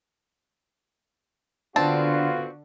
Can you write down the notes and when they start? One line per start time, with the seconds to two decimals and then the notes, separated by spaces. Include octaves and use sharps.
1.76 D3 B3 C4 D4 F4 F#4 A5